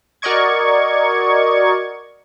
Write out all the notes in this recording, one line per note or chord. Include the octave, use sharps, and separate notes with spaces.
F#4 A#4 D5 D#5 C#6 G#6